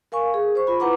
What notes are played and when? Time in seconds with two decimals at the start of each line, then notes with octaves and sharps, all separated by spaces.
0.12 A#4 F5 G#5 C#6
0.34 G#4
0.55 C5 C#6
0.67 F4 B5
0.80 E4 B4 F#5 A#5 D6